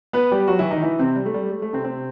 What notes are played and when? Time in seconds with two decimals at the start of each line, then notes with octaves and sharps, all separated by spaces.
0.13 B3 B4
0.32 G3 G4
0.48 F#3 F#4
0.59 E3 E4
0.71 D#3 D#4
0.82 E3 E4
0.99 C3 C4
1.16 G3
1.26 A3
1.34 G3
1.51 A3
1.62 A3
1.73 C3 C4
1.84 C3 C4